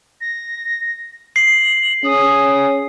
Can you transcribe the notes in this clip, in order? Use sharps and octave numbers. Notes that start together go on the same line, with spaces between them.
A#6
C7 F#7
C#4 G#4 D#6